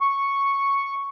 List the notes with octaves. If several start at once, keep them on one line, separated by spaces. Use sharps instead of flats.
C#6